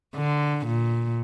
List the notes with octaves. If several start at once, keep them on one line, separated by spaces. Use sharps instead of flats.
D3
A#2